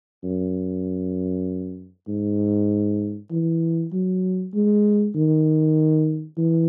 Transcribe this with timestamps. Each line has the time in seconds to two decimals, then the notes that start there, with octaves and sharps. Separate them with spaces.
0.24 F#2
2.08 G#2
3.31 E3
3.93 F#3
4.54 G#3
5.15 D#3
6.38 E3